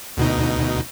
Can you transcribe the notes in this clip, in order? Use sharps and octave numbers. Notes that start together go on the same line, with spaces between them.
D2 B2 D#4